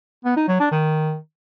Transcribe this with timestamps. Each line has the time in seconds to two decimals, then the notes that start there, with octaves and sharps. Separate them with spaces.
0.25 B3
0.36 D#4
0.48 F#3
0.60 D4
0.71 D#3